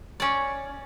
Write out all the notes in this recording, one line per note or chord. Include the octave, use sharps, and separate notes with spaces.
C#4 D5